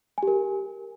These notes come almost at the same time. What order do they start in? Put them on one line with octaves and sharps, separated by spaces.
G#5 G4 A#4